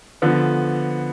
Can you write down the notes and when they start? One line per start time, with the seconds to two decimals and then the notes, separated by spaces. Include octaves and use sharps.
0.22 D3 F3 B3